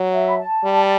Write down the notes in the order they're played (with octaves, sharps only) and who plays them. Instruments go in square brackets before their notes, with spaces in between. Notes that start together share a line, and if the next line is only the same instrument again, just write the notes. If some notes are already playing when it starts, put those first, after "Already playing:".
Already playing: [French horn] F#3
[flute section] E5
B5
A5
[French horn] G3